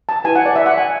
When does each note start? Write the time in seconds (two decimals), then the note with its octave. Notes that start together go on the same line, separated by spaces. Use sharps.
0.09 A5
0.24 E4 B4 G#5
0.36 F#5
0.45 D5
0.56 E5
0.66 F#5
0.78 G#5